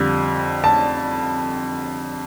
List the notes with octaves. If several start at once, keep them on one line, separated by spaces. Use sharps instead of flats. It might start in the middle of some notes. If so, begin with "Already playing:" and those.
Already playing: F2 D3 G3
A5